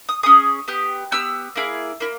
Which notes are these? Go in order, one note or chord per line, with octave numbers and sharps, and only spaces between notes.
D#6
C#4 G#4 D#6
B3 G4
B3 G4 E6
A#3 E4 G#4
A#3 E4